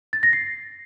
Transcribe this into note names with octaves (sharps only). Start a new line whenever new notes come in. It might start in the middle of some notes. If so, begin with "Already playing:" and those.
A6
A#6
C7